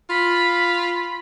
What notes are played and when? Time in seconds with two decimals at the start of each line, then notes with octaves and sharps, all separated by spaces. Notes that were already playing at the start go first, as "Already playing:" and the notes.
0.09 F4 B5